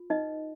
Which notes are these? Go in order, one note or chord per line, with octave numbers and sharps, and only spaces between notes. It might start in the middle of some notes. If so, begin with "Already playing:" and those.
Already playing: F4
D#4 B4 D#5